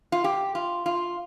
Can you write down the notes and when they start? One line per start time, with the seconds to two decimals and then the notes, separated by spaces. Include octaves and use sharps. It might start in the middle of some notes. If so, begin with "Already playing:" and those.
0.12 F4
0.24 G4
0.55 F4
0.86 F4